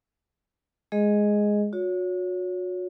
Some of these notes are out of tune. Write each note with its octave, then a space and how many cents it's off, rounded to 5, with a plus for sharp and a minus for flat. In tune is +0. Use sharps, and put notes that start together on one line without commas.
G#3 +0 G#4 +0 D#5 +0
F#4 -35 C#5 +20